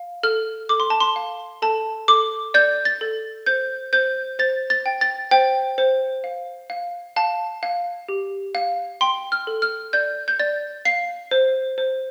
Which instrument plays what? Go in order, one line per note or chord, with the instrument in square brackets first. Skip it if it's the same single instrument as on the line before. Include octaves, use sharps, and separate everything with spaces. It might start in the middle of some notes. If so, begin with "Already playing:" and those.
Already playing: [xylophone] F5
A4 F6
A4 D6
C6
A5
C6
F5
A4 A5
A4 D6
D5 G6
A6
A4
C5 G6
C5 G6
C5 A6
A6
G5
A6
C5 G5
C5
F5
F5
F5 A5
F5
G4
F5
G5 C6
F6
A4
F6
D5 G6
G6
D5 A6
F5 C7
C5
C5